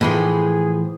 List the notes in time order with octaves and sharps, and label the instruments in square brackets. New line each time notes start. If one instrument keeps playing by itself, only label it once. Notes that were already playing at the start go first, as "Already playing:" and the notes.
[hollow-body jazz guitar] A2 E3 F3 [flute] G#4